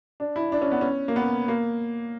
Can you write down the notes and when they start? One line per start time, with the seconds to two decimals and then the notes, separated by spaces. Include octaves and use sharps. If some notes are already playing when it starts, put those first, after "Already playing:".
0.20 D4
0.36 E4
0.52 D4
0.62 C#4
0.72 B3
0.81 C#4
1.08 A#3
1.16 B3
1.48 A#3